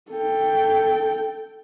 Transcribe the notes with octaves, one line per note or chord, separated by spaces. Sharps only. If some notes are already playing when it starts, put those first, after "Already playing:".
A4 G5